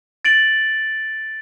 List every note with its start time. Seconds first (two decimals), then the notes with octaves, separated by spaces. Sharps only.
0.25 A6 D7 F#7